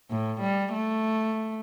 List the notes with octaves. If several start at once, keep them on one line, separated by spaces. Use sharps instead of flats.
A2
G3
A3